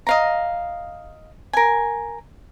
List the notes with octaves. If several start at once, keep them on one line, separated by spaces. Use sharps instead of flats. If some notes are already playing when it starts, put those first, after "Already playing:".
D#5 F5 A#5
A#4 G#5